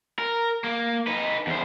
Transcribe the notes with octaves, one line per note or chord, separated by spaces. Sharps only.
A#4
A#3
D#4 B4
E2 C5